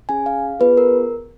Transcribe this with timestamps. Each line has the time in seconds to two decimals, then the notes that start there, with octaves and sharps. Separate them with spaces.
0.09 C#4 G#4 G#5
0.26 F5
0.60 B3 F4 G#4 B4
0.77 A#4